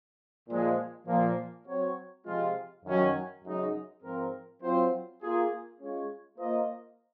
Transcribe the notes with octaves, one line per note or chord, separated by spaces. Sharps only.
A#2 F3 G#3
A#2 F3 A#3
F#3 C4 F#4 C#5
C3 F3 G#3 C4 F4
F#2 D#3 F#3 C#4
F#2 C#3 G#3 D#4
G#2 F3 C4 F4 A#4
F#3 C4 F4 C5
A#3 F4 G#4
G#3 C#4 F4 G#4 C#5
A#3 F4 C5 D#5